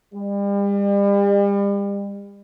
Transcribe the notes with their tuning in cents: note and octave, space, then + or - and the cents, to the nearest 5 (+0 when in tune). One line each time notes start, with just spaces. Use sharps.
G3 +40